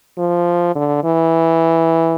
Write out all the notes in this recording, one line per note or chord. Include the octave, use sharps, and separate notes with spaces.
F3
D3
E3